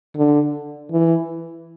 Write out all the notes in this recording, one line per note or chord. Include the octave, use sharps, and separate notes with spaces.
D3
E3